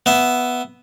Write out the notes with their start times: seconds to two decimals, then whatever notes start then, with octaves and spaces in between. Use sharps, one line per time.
0.06 B3 E5